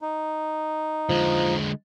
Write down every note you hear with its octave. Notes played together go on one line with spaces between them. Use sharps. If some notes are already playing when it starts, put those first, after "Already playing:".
D#4
D3 F3 G#3